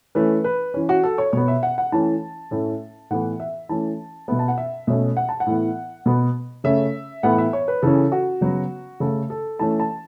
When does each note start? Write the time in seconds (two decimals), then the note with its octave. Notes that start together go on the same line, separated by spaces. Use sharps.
0.15 E3 A3 C#4 B4
0.44 B4
0.74 E3 C#4
0.89 F#4
1.03 A4
1.18 C#5
1.33 B2 B3 C#5
1.48 E5
1.63 F#5
1.78 F#5
1.92 E3 A3 C#4 A5
2.51 A2 A3 C#4
3.11 A2 E3 B3 F#5
3.40 E5
3.69 E3 A3 C#4 A5
4.28 B2 B3 E5
4.39 A5
4.48 F#5
4.58 E5
4.87 B2 A3 C#4 E5
5.17 F#5
5.29 A5
5.40 F#5
5.46 A2 E3 B3
6.06 B2 B3
6.64 C#3 A3 C#4 E5
7.23 A2 E3 B3 F#5
7.38 E5
7.53 C#5
7.68 B4
7.82 C#3 E3 C#4 A4
8.12 F#4
8.41 C#3 F#3 B3
9.00 C#3 A3 C#4 A4
9.30 A4
9.59 E3 A3 C#4 A5
9.80 A5